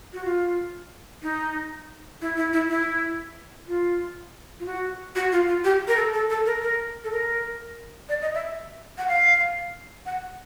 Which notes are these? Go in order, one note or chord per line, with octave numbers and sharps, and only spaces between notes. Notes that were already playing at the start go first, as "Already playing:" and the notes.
F#4
F4
D#4
E4
E4
E4
E4
F4
F4
F#4
F#4
F4
F4
G4
A#4
A4
A4
A4
A#4
A#4
A4
A#4
D5
D#5
E5
F#5
F5
F#5